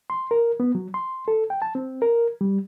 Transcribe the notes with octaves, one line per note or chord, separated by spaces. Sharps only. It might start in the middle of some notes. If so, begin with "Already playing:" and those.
C6
A#4
B3
F#3
C6
A4
G5
A5
C4
A#4
G3